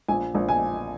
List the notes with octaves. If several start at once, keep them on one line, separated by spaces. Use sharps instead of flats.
A#1 G#5
A#1
G#5